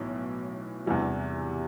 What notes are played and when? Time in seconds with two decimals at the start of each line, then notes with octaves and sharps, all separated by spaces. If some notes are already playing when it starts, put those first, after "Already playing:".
Already playing: B1 A2 E3
0.86 E2 C3 E3 G3